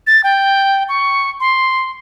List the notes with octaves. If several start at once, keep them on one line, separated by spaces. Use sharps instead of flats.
A6
G5
C#6
C6